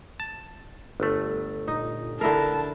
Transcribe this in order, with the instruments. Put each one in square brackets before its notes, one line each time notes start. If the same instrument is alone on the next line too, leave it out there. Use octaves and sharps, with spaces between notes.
[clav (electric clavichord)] A5
G1 A3
[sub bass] A#2 [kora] D#4
[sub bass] A1 [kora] D3 E4 A#4 [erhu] A5